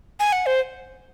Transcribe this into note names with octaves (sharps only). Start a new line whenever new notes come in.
G#5
F#5
C5